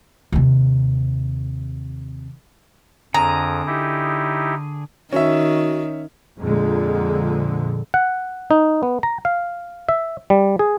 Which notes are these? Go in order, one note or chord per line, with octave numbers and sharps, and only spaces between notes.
D#2 C3
F2 D3 G#4 A#5
D#4 E4 G4
D#3 C#4 F#4 E5
F2 A#2 D3 G#3
F#5
D#4
B3
A#5
F5
E5
G3
G#4